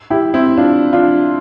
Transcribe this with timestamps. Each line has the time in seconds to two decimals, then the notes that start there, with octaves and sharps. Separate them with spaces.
0.10 E4 G4
0.34 C4 E4
0.58 D4 F4
0.93 D4 F4